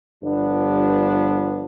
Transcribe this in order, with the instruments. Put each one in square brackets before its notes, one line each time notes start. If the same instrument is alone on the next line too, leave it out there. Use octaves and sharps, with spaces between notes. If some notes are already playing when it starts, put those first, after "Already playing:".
[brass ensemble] G1 G2 F3 B3 D4